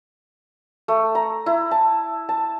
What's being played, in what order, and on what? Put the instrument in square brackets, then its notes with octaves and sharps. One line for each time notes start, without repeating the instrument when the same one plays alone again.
[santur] A3
A#5
E4
A5
A5